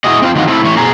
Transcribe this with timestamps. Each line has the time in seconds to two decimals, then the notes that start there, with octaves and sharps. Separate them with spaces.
0.04 E4 F#4 G#4 D#5
0.22 C4 F4
0.35 D#3 F3 C4 F4 F#4
0.48 A3 C4 E4
0.64 A2 E3 C#5
0.77 B2 G#4 A#5